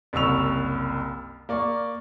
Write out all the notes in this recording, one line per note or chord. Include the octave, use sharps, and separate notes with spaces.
F#1 C2 C#6 E6 F7
A#3 D5 C#6